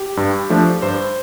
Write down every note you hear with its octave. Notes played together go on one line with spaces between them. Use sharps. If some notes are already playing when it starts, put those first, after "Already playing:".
Already playing: G4
G2
F3 A3 D4
G2 C5